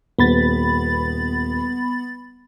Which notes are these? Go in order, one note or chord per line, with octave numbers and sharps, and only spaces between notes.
D#1 B3 B5 A6